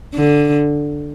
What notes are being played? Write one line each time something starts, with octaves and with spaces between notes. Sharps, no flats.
D3